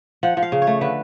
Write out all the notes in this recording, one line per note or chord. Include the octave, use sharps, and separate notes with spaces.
F3 F#5
F3
F5
C#3
C#5
A3
D3 B4